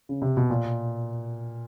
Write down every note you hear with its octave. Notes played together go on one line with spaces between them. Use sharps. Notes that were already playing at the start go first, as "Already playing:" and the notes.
C#3
C3
B2
A#2